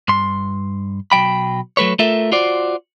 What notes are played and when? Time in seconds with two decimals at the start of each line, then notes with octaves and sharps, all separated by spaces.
0.08 G2 C6
1.12 B1 F#3 G5 B5
1.77 F#3 A3 B4 C#5
1.99 A3 F4 A4 A#4 E5
2.32 F4 F#4 C5 D5